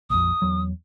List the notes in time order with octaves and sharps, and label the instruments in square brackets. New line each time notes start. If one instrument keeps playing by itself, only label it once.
[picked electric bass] A#1 F2 [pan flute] D#6
[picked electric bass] E2 F#3